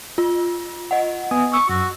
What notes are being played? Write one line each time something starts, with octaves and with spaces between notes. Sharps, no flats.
F4
D#5 F#5
B3 G#5 D#6
C#6 E6
F#2 F#4